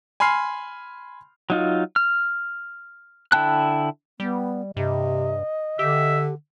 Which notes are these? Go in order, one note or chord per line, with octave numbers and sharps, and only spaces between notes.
G#5 B5 C6 F6 C7
F#3 D#4 F4
F6
D3 E4 G5 A5 F#6
G3 B3
G2 C3 D#5
D3 G4 E5